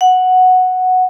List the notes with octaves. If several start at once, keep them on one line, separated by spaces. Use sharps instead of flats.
F#5